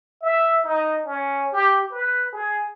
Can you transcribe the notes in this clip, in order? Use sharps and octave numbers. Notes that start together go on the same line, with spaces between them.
E5
D#4
C#4
G4
B4
G#4